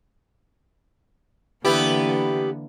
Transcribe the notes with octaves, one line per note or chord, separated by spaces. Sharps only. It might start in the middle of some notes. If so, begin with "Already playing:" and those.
D3 E3 A#3 B3 E4 G4